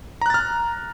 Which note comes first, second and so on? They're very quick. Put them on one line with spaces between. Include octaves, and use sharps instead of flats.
A#5 F#6 A6 F6